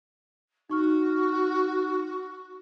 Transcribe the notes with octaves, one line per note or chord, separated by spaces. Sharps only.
D#4 F#4 C#6 F6